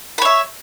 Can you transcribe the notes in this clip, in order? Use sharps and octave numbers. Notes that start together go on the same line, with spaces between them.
C#5 E5 B5